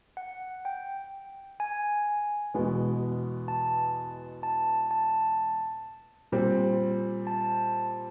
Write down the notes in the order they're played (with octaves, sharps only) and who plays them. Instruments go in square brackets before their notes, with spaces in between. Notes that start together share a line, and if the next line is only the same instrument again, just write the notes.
[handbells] F#5
G5
G#5
[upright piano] E2 B2 G#3 B3
[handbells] A5
A5
A5
[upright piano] A#2 G3 C4
[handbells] A5